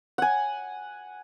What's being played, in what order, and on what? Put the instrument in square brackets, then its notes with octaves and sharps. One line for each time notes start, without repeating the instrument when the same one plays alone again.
[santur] F#5 G#5